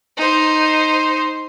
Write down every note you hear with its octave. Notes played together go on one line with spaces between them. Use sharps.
D#4 C5